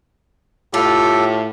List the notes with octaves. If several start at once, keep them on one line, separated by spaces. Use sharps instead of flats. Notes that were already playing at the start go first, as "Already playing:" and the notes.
A2 F4 G4 A4